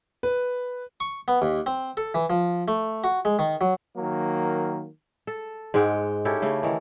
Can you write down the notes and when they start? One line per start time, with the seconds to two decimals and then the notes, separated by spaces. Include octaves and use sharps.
0.23 B4
1.00 C#6
1.28 B3
1.42 D#2
1.66 C4
1.97 A4
2.14 E3
2.30 F3
2.68 A3
3.04 F#4
3.25 G#3
3.39 D#3
3.61 F#3
3.97 D#3 F#3 A#3
5.27 A4
5.74 G#2 G#3 F#5 G5
6.25 C#4 E4 G4 A4
6.42 C#3 A3
6.63 D#3 E3